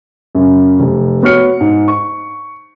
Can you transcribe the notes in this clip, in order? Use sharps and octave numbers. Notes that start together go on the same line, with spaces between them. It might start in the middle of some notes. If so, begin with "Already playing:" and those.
F#2 C#3
F1
B3 F#4 C#5 F6 C#7
G#2
C#6